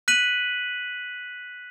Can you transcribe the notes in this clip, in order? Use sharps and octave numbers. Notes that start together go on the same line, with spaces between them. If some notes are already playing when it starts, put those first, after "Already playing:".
F#6 B6 D#7 F#7